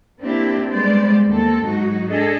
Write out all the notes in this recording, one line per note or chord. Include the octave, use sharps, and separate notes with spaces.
A#3 C4 D4 E4 G4
G3 G#3 B3 C5 D5
D#2 A#3 C4 A4
G#2 F#3 D#4 F#4
D4 G#4 A4 D#5